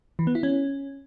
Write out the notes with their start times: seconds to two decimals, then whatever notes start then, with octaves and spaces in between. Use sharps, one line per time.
0.19 E3
0.27 B3
0.35 E4
0.43 C#4